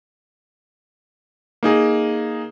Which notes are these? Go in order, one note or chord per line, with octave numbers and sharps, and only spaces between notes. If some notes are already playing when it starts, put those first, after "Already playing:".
A#3 D#4 G#4